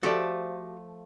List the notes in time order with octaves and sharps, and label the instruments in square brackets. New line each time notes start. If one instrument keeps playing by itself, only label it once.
[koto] F3 A3 A4 [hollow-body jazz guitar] F#4 G4 D5